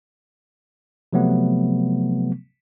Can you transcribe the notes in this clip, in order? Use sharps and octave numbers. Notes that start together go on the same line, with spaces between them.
C3 F3 F#3 A3 B3